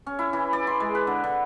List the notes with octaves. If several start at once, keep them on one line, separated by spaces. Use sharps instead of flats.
C#4
E4
E3
D5
C6
G#3
B4
D3
D3